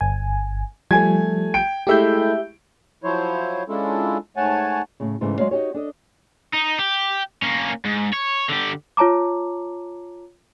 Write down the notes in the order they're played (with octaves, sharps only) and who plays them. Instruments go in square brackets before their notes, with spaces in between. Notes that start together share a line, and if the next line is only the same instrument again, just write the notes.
[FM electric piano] G1 G#5
[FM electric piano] F3 G3 [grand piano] A3 G#5 G#6
[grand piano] G5 D7
[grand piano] G#3 A3 E4 [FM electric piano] G4 E5 G6
[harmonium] F3 F#3 E4 C5 C#5
G#3 C#4 D4 E4 F4 A4
G#2 A3 C#5 F#5 G#5 A5
[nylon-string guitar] A2 C#3
G#2 C#3 E3 A3 C4
F#3 G#3 D#4 C#5 D5 F5
D#4 F#4 G4 C#5
D4 A4 D#5
[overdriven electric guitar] D#4
G4
A#3 C#4
G#2
C#5
D3 G4
[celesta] F4 C#5 A5 A#5 D6